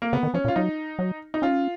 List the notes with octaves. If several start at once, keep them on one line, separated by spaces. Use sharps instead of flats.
A#3
C#3 B3
D#3
F3 C#4
A#2
F4
F#3 D#4
F#3
D#4
C#4 F4